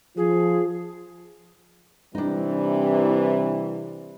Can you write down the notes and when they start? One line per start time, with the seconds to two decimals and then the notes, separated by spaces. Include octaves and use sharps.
0.17 F3 F4 G#4
2.15 C3 E3 G3 D4 D#4